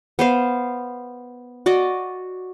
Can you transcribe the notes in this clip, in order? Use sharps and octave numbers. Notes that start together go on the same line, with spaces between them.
B3 C5 F5
F#4 D5 D#5